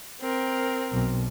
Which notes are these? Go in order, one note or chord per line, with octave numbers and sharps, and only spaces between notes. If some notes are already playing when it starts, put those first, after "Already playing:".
C4 A#4
B1